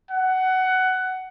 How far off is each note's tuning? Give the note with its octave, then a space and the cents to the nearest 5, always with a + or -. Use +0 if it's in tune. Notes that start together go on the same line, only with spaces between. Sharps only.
F#5 +15